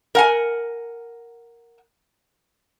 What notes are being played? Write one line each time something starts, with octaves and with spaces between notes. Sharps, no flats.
A#4 F#5 G#5